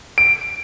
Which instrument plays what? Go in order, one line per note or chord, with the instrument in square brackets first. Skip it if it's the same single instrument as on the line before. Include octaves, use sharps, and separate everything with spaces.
[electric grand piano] D7